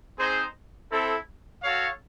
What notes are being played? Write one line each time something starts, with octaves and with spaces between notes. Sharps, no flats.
C4 D#4 G#4 C5
C4 E4 A4
F#4 A4 C#5 F5